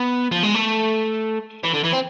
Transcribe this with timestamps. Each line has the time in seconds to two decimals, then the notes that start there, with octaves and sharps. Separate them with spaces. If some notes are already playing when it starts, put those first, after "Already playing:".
Already playing: B3
0.32 F3
0.43 G#3
0.55 A3
1.63 E3
1.74 D3
1.84 E3
1.92 C4